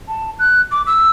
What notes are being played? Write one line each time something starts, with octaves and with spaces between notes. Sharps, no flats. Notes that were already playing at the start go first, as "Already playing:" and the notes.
A5
F#6
D6
E6